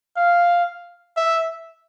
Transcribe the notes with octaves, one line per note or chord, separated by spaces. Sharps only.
F5
E5